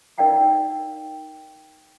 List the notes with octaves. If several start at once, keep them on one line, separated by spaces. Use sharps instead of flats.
D#4 A#4 D5 F5 G5 A#5